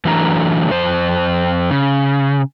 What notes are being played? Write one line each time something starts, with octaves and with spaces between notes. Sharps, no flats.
E3 F#3 A3 D4 G#5 A#5
F2 C5
C#3